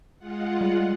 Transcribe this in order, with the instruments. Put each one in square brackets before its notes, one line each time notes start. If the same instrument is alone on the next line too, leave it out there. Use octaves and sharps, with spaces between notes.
[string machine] G#3 F4 F#5
[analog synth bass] G3